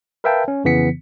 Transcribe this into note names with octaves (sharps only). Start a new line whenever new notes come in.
A#4 B4 E5 F5 G5 A5
C#4
F2 C#3 E3 B3 B6 C#7